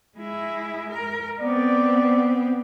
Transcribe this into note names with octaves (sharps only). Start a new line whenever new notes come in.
G#3 E4
A#4
B3 C4 D5